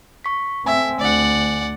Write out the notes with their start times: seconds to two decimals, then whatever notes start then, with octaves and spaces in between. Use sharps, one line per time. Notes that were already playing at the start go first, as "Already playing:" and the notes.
0.24 C#6 B6
0.66 A3 C4 E5 G#5
1.00 D2 D5 F#5